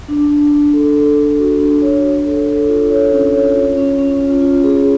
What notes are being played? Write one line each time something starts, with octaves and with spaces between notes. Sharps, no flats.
D4
D4
D4
A4
A4
A4
F#4
D4
C#5
C#5
A4
A4
F4
C#5
C#4
C#5
F4
C#4
C#4
F4
F4
G#4